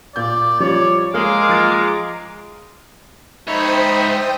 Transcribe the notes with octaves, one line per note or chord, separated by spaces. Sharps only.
A#2 D5 G6
F3 G3 C#4 C#5 D5
G#3 A#3 F5 A#5 D6
F3 A6 C7
G#2 D#4 C5 C#5 E5 G5 B5 D#6